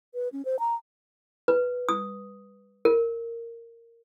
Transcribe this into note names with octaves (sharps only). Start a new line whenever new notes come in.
B4
C#4
C5
A#5
B4
D#6
A#4